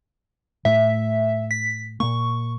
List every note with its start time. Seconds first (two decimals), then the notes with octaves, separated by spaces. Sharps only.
0.65 A2 A3 E5
1.51 B6
2.00 A#2 A#3 C#6